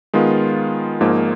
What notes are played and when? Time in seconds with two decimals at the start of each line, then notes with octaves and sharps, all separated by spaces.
0.14 D#3 G#3 B3 F4
1.01 G#1 G#2 F3 A#3